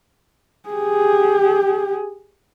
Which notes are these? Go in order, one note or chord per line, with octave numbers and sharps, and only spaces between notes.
G4 G#4